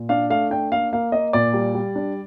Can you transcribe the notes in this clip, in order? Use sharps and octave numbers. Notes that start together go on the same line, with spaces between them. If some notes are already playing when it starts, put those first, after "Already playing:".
Already playing: A#2
D4 F5
A3 F5
D4 G5
A#3 F5
A#3 F5
A#3 D#5
A#2 D5
G3
G3
D4